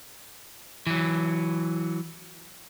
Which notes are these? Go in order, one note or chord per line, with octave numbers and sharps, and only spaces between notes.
E3 F#3